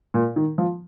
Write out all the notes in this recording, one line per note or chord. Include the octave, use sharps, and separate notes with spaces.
A#2
D#3
F3